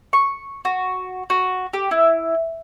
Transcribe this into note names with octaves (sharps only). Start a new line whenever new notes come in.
C#6
F#4
F#4
G4
E4